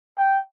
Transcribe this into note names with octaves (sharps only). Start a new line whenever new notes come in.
G5